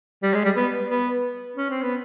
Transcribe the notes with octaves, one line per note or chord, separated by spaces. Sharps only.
G3
G#3
G3
B3
B3
C#4
C4
B3